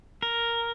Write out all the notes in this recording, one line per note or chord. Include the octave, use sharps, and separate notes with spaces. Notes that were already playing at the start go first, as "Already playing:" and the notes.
A#4